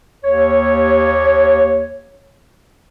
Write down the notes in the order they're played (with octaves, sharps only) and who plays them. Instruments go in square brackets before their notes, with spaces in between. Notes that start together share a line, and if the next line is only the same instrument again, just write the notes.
[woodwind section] D#2 C#5